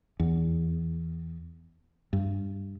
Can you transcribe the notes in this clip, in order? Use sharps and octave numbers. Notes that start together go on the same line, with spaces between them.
E2
G2